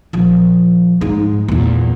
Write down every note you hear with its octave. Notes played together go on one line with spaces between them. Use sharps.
A#1 F3
G#2
E2 A#2